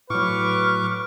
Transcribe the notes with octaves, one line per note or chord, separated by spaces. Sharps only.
A2 F#3 B4 C#6 D6 F6